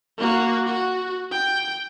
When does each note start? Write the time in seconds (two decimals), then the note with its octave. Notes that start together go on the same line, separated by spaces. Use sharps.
0.18 A#3 F#4
0.66 F#4
1.32 G5